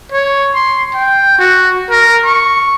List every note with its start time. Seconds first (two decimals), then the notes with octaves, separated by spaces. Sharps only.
0.12 C#5
0.54 C6
0.95 G5
1.38 F#4
1.90 A#4
2.25 C#6